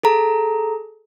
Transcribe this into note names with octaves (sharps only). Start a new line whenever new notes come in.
G#4 A4 A#5